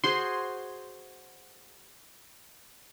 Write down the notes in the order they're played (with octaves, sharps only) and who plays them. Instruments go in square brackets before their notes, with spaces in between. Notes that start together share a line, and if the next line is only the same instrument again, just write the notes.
[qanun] F#4 G#4 C5 [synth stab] C6